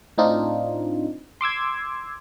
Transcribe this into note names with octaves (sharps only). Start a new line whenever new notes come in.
A2 C4 D4 D#4 F4
C6 D6 E6 G#6